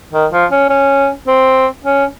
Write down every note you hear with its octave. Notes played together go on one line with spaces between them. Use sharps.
D#3
F3
C#4
C#4
C4
C#4